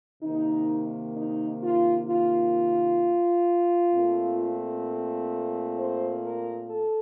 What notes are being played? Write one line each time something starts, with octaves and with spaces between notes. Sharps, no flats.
C3 D#3 A#3 D#4
D#4
F4
F4
A#2 A3 C4
C5
A#4
A4